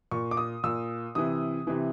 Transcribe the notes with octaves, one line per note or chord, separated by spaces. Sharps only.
A#2 C#6
D6
D#6
A#2 E6
C3 E3 D#6
C3 E3